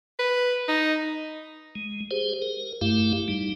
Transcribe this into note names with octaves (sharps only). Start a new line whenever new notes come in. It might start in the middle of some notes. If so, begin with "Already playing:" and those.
B4
D#4
G#3
G4 G#4 C5
A#4
G2 A3 E4 G4 F5
G3 D#4